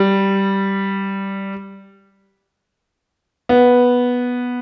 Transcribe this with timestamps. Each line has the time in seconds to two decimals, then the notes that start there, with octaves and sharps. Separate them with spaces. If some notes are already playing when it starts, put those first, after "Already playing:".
Already playing: G3
3.49 B3